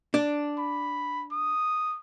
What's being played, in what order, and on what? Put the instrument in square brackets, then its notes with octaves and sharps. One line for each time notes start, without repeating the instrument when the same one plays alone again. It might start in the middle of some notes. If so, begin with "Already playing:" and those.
[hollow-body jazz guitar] D4
[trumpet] B5
D#6